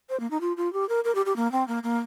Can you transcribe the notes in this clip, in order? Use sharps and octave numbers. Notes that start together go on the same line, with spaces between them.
C5
A#3
D#4
F4
F4
G4
A#4
A#4
G4
G4
A#3
C4
A#3
A#3